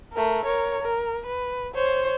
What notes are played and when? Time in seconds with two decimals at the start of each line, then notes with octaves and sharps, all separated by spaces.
0.13 A3 A#4
0.45 A#4 C#5
0.82 A#4
1.26 B4
1.74 C5 C#5